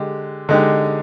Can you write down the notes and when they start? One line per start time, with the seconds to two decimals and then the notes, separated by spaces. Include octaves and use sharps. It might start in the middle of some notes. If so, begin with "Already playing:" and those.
Already playing: D3 G#3 G4
0.49 D3 G#3 D#4 G4